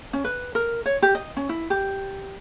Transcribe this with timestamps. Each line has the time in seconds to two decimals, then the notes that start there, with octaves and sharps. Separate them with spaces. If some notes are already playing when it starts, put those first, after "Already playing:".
0.13 C#4
0.24 B4
0.55 A#4
0.86 C#5
1.02 G4
1.15 D#5
1.37 C#4
1.49 E4
1.70 G4